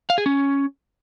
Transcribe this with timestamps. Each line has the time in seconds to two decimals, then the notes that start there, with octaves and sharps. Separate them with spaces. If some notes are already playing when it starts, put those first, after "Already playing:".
0.10 F5
0.18 G#4
0.26 C#4